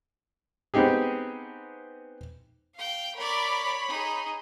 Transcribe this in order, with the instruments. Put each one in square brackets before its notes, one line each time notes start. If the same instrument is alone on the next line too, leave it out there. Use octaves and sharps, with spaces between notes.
[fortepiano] B3 C4 D#4 G4 G#4
[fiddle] F5 G5
[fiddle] A#4 D5 [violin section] C#5 B5
[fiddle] D#4 G#4